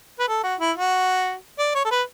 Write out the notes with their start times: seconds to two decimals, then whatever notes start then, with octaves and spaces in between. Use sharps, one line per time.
0.19 B4
0.28 A4
0.43 F#4
0.60 E4
0.76 F#4
1.59 D5
1.75 C#5
1.85 A4
1.91 B4